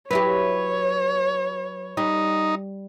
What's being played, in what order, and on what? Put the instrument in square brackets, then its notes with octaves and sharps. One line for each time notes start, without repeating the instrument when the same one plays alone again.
[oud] F#3 E4 G4 [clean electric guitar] B4 [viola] C#5
[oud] G3 [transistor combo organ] D#4